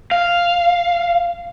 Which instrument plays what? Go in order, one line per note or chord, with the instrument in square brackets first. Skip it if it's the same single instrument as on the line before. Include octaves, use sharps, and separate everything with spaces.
[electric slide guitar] F5